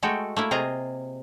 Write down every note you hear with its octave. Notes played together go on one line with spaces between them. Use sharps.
G#3 A3 F#4 A4 G5
A3 A#3 E4
C3 F4 G#4 D#5 A#5